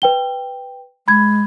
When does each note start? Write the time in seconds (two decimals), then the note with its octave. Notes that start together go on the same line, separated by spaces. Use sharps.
0.02 B4 G5 G7
1.08 G#3 B5 G#6